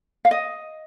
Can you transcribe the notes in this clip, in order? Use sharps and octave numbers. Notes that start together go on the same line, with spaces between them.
F5
D#5